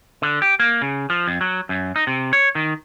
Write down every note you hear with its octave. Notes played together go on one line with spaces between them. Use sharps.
D3
G4
A#3
C#3
F3
F2
F#3
F#2
D#4
C3
C#5
D#3